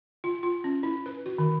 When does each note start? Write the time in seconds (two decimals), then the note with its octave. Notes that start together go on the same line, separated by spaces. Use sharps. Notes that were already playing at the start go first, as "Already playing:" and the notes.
0.24 F4
0.43 F4
0.64 C#4
0.83 E4
1.06 B4
1.26 F#4
1.38 D#3